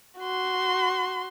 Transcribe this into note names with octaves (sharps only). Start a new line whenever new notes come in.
F#4 C6